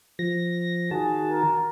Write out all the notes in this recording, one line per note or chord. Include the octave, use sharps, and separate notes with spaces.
F3 A#6
D#3 F#4 G#4 A5
A#4